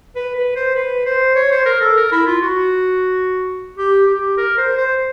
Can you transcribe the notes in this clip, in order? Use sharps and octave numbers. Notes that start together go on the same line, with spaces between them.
B4
B4
C5
B4
C5
C#5
C5
A#4
A4
A#4
E4
F4
F#4
G4
G4
A#4
C5
C5